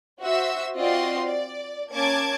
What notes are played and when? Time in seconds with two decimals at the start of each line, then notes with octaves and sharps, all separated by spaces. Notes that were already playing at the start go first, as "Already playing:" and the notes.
0.23 F#4 C5 E5 E6
0.77 C4 F4 F#4 D5 D#5 C6
1.26 D5
1.90 A#3 C#4 A5 D6 G#6